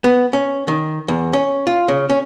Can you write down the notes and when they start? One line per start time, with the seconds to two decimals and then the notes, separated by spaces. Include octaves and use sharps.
0.04 B3
0.33 C#4
0.68 D#3
1.08 E2
1.33 C#4
1.67 F4
1.88 C#3
2.10 C#4